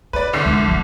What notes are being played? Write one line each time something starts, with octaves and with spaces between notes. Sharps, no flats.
B3 B4 D5
C2 D3 C7
C#2
F3 A#3